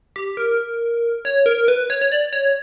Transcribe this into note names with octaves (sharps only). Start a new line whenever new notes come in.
G4
A#4
C#5
A#4
B4
C#5
C#5
D5
C#5